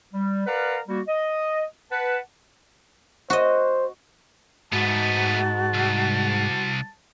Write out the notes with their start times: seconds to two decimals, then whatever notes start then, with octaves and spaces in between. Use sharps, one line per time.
0.14 G3
0.47 A#4 B4 D5 F5 F#5 A#5
0.88 G3 A#3 F#4
1.08 D#5
1.91 B4 F#5 A5
3.30 F#4 C5 D#5
4.72 G#2 A3 B3 F#4 A5
5.74 C2